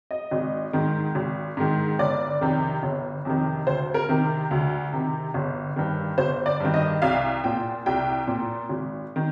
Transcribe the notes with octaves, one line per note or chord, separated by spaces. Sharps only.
D#5
G#1
G#2 D#3
G#1
G#2 D#3
G1 D5
F2 C3 D#3
G1
F2 C3 D#3
D2 C5
A#4
C3 D#3
D2
C3 D#3
G1
G2 D#3
G1 C5
D5
G2 D#3
D#5
C2 F5
A#2 G5
C2 G5
A#2
G#1
D#3